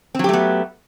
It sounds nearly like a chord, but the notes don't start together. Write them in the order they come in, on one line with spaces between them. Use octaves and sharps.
C4 F#3 G4 A3 B3